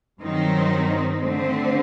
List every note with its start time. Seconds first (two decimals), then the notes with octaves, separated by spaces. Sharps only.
0.22 G2 D#3 F#3 C4 D#4
1.21 D3 A3 C4